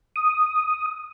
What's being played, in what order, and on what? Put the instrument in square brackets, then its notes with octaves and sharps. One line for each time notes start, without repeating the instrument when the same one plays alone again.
[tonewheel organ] D#6